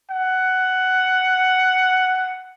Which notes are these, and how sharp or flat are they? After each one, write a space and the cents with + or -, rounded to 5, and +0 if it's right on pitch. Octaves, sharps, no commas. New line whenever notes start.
F#5 +10